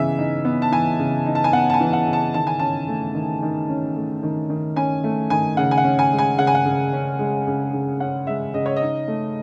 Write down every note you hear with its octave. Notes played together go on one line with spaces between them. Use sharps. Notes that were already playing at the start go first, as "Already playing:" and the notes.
Already playing: C#3 E3 B3 D#4 E5 G#5
D#4
B3
A5
E3 G#5
C#3
D#4
A5
G#5
B3 F#5
A5
G#5
E3
F#5
C#3
A5
D#3 A5
G#5
C#4 A5
A3
D#3
D#3
C#4
A3
D#3
D#3
C#4 G#5
A3
D#3 G#5
C#3 F#5
G#5
F#5
C#4
G#5
G#3
G#5
C#3 F#5
G#5
F#5
C#3
C#4
G#3
C#3
C#3
C#4 F#5
G#3 E5
C#3 D#5
C#5
D#5
D#4
A3